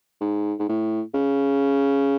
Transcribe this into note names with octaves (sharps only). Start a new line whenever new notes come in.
G#2
G#2
A2
C#3